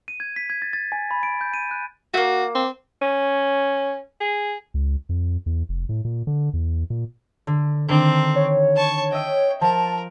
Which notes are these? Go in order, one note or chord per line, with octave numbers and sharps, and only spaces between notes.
D#7
G#6
B6
G#6
A6
A6
G#5
B5
D7
G6
D#7
F#6
A3 A#3 F#4
C4
C#4
G#4
C#2
F2
E2
F1
A2
A#2
D3
E2
A#2
D3
D3 D#3 C4 D4
C#5
A5 C#6
D#5 E5 G5 D7
F3 A#4 A5